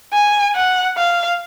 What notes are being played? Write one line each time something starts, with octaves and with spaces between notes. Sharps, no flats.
G#5
F#5
F5